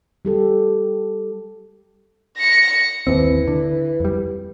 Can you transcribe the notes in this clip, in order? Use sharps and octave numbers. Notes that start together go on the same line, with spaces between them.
G3 G4 A4
A#6 C#7
G1 D#2 E3 C4
D3
F2 G3